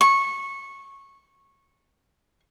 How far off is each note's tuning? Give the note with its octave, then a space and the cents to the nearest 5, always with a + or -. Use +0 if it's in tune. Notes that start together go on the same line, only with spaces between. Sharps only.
C#6 -15